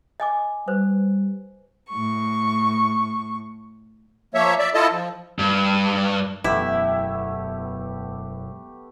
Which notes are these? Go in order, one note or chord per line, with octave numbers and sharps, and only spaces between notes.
D#5 G#5 D6
G3 B4 C5
A2 C#6
F3 A#3 C#5 E5
D5 E5
E4 F4 A4 D#5 A5
F3
G2
E1 F#2 E3 A3 B3 E4 G4